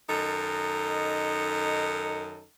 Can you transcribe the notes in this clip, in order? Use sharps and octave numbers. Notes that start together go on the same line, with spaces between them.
F#2 D#3 D#4 A4